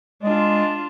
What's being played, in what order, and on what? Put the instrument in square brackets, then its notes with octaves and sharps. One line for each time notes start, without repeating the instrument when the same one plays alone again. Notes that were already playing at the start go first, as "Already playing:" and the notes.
[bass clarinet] G#3 [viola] D4 F4